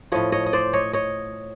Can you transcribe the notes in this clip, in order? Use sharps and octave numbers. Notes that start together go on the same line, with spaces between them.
A2 F3 C#5 D#5
C#5 D#5
D#5
C5 D5
C#5 D#5
C#5 D#5